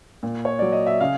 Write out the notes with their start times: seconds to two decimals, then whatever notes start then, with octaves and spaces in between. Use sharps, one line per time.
0.23 A#2
0.45 C#5
0.59 F#3 D5
0.72 D#5
0.87 E5
1.00 C#3 F5